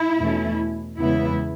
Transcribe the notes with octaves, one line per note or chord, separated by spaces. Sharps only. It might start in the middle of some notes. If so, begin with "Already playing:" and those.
Already playing: E4
E2 B2 A3 C#4
E2 C#3 G#3 B3 E4